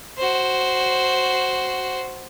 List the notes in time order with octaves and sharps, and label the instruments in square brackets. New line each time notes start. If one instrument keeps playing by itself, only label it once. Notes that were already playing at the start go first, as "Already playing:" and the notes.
[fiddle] F#4 C5